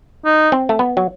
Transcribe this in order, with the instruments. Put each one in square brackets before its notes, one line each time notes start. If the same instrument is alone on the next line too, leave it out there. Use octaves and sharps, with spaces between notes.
[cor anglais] D#4
[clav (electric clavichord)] C4
A3
B3
F#3